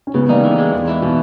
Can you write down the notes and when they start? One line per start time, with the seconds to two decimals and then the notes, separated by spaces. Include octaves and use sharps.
0.07 C#4
0.14 C#3 G#3 B3
0.29 G3 A#3 D#4
0.44 E3
0.58 G#3
0.73 E2
0.88 E4
1.02 B2 E3 G#3